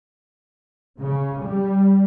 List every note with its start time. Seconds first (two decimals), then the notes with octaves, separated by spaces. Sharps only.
1.00 C#3
1.42 G3